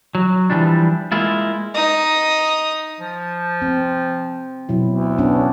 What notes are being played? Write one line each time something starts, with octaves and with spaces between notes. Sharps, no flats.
F#3
E3 F3 G3 D4
G#3 A#3 E4 F4
D#4 D#6
F3
C4
B2 F#3 E4
D2
B3 C#4 D4